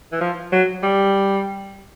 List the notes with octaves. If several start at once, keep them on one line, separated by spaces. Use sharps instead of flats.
E3
F3
F#3
G3